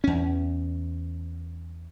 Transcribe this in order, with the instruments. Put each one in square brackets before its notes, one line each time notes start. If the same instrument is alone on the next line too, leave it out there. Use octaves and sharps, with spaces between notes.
[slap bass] E2 C#4